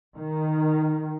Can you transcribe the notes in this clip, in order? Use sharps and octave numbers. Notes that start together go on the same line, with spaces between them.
D#3